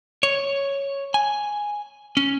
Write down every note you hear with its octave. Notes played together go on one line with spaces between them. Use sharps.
C#5
G#5
C#4